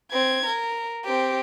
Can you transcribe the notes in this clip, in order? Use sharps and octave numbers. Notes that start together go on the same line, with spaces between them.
C4 G#6
A#4
C4 G4